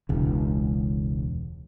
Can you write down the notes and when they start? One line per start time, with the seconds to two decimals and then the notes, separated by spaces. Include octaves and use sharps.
0.09 E1 C#2